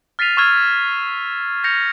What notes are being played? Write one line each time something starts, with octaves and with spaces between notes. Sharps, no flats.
F6 A6 B6 C7 D#7 F7
C#6 E6 F6 G#6 D#7 F7
G6 A#6 C#7 F7